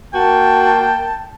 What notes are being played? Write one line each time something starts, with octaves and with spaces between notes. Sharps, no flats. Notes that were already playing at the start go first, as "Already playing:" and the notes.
A#3 F#4 G5 A5